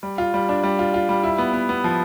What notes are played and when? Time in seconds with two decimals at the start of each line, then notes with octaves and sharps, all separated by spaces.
0.03 G3
0.18 F4
0.34 G3
0.49 D4
0.64 G3
0.79 F4
0.94 F4
1.09 G3
1.23 E4
1.38 B3
1.53 B3
1.69 B3
1.84 F3